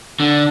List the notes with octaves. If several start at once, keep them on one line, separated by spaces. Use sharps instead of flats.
D3